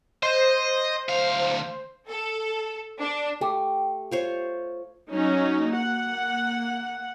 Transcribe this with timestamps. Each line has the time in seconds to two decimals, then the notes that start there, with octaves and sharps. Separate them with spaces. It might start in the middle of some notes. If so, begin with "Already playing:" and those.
0.23 C5 D#5
1.09 D2 F5
2.07 A4
2.99 D4
3.41 A3 G4
4.11 F4 C5 C#5
5.11 F#3 C#4 D#4
5.70 A#3 F#5